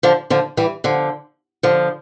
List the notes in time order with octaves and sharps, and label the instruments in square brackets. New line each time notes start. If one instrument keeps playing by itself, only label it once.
[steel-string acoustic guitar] D3 F3
D3 F3
E3 G3
D3 F3
D3 F3